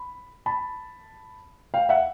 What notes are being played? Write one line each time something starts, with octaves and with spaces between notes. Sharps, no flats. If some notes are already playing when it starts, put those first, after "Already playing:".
Already playing: B5
A5 B5
F5 G5
E5 F#5